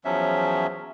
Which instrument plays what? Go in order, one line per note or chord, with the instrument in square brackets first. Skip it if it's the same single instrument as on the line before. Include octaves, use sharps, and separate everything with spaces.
[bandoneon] E2 F3 F#3 C#4 E5